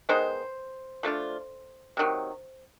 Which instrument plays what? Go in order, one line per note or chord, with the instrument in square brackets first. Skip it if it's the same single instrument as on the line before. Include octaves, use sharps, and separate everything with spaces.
[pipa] D#3 G#3 B3 D#4 C5
F3 A3 D4 F4
C3 D#3 F#3